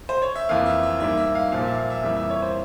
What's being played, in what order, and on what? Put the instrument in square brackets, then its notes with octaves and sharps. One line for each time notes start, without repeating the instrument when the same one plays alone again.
[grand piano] C5
C#5
E5
F2 E3 A#3 F5
E5
E5
G#2 G3 A#3 E5
E5
F5
A#2 F3 A#3 F5
E5
F5
E5
F2 E3 G3 A#3 E5
E5
C#5
C5